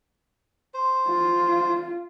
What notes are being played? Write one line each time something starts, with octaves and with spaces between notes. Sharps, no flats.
C5
F4